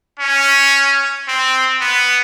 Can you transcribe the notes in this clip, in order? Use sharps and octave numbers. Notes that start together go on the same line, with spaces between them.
C#4
C4
B3